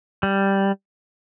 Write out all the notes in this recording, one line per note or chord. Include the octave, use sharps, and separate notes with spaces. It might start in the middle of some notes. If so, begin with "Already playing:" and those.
G3